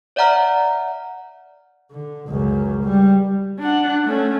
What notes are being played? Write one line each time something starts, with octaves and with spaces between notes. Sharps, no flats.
C#5 D5 E5 F#5 A#5 F6
D3
C#2 F#2
G3
D4 F#5
A3 C#4